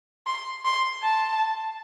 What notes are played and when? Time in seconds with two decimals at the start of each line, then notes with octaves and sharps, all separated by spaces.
0.27 C6
0.65 C6
1.03 A5